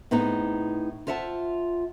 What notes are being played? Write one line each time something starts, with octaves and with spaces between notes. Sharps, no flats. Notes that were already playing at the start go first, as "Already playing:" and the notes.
A2 B3 C4 D#4 G#4
F4 C5 E5 F#5 A5